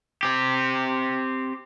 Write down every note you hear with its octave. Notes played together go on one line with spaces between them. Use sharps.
C4 G4